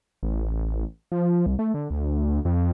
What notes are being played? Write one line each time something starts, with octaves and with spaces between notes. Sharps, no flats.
A1
F3
C2
A3
D3
D2
F2